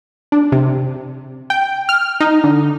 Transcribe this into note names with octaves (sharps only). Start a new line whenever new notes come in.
D4
C3
G5
F6
D#4
D3